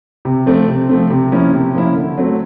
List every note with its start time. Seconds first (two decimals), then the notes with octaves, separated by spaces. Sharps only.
0.25 C3
0.46 F3 A3 C4
0.68 C3
0.89 F3 A3 C4
1.10 C3
1.32 F3 A#3 C#4 E4
1.53 C3
1.75 F3 A#3 C#4 E4
1.96 D3
2.17 F#3 A3 C4